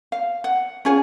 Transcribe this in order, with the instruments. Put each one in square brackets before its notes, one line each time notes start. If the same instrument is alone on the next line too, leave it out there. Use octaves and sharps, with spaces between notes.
[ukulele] F5
F#5
C#4 F4 G#4 C#5